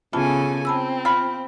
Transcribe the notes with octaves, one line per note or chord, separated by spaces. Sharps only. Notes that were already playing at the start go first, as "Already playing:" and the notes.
C#3 E3 B3 F4 A4 G#5 A5
C4 A5 B5 E6
F4 B5 F6